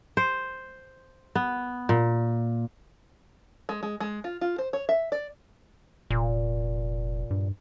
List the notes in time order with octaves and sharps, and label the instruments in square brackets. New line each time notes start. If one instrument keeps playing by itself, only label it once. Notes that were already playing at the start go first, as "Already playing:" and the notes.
[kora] C5
B3
A#2
[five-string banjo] G#3
G#3
G#3
F4
F4
C5
C#5
E5
D5
[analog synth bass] F1 [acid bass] A#2
[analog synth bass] G2